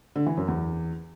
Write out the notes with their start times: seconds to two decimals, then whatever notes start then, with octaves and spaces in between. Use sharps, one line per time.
0.16 D3
0.26 E3
0.37 F#2
0.48 E2